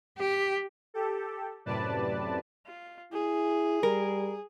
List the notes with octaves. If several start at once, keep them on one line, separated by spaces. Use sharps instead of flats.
G4
G4 A4
F#2 A2 C3 B4 D5 A5
F4
E4 G#4
G3 A#4